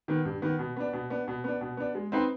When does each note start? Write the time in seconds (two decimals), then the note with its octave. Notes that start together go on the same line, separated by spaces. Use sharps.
0.08 D#3 B3
0.25 G2
0.42 D#3 B3
0.59 B2
0.76 B3 D4
0.93 B2
1.10 B3 D4
1.28 B2
1.44 B3 D4
1.61 B2
1.77 B3 D4
1.95 G#3
2.12 C4 D#4 B4